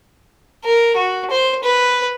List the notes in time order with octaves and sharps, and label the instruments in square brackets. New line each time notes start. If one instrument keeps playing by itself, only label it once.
[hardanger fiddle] A#4
F#4
C5
B4